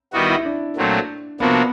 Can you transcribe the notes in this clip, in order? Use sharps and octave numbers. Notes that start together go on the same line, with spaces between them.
D#3 G3 B3 D#4 E4 F#4
E4
D4
A#2 F#3 A3 C4
C3 F3 A#3 B3 D4 F#4